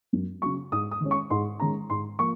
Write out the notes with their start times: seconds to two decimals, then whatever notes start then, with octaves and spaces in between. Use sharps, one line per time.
0.13 F#2
0.42 C#3 F#3 C#6
0.72 G#2 D#6
0.91 D#6
1.01 D#3 G#3 C#4
1.11 C#6
1.30 G#2 C6
1.60 D#3 G#3 C#4 A#5
1.90 G#2 C6
2.19 F3 A#3 C#6